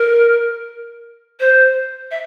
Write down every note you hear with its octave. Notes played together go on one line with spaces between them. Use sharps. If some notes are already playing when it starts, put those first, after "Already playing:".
Already playing: A#4
C5
E5